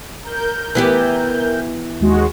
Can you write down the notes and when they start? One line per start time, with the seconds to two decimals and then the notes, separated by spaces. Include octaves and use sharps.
0.24 A#4 G6
0.75 E3 B3 G4
2.00 D#2 G#3 F#4